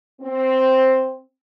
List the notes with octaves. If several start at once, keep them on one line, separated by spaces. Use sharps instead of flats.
C4